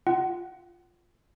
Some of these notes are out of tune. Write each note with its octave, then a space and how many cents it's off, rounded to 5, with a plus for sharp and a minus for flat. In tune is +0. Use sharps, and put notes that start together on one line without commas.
F4 +0 F#5 +30